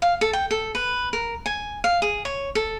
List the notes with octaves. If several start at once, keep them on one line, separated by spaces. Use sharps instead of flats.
F5
A4
G5
A4
B4
A#4
G#5
F5
G#4
C#5
A4